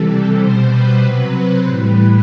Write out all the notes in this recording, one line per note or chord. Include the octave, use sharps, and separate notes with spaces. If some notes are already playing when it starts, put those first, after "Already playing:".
Already playing: C3 E3 G3 A4
B2 G3 C5
B4
C3 F#3 B4
C5
A2 E3 G3 B4